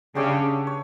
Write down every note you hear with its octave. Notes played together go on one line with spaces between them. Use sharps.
C#3 D4 G4 C#5 E5
C#5